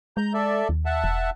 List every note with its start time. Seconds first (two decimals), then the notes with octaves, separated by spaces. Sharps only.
0.17 G#3 A#5 G6
0.34 A4 D5 E5
0.69 D#2
0.86 E5 F#5 A5
1.04 E1